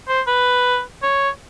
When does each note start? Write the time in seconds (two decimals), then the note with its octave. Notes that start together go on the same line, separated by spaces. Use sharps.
0.08 C5
0.27 B4
1.03 C#5